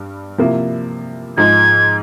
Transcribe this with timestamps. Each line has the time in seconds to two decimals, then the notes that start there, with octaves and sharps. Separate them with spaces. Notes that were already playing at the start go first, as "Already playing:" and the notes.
Already playing: G2 G3
0.38 C3 F3 A#3 E4
1.37 G#2 F3 G#3 G#6